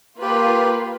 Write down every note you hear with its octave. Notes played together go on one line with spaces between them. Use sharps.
A#3 F4 G4 B4